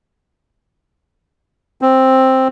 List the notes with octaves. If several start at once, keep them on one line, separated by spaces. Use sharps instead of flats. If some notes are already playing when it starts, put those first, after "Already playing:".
C4